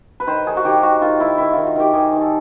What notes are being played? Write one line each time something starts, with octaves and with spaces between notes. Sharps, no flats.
B4
D#3 C5
D#3 G#4
F#4
D#3 G4
D#3 F#4
D#3 F4
D#3 E4
D#3 E4
D#3 F4
F#4
D#3 G4
D#3 G#4
D#3
A4